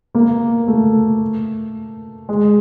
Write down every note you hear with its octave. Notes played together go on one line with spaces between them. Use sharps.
A#3
A3
G#3